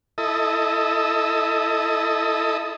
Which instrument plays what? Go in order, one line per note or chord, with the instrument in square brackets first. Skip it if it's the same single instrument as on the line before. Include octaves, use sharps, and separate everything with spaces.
[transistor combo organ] E4 A4 D#5